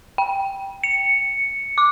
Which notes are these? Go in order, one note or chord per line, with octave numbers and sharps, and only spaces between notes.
G5
C#7
D6